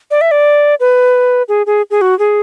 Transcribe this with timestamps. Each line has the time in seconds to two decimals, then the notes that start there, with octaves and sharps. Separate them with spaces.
0.11 D5
0.21 E5
0.31 D5
0.80 B4
1.48 G#4
1.66 G#4
1.91 G#4
2.01 F#4
2.19 G#4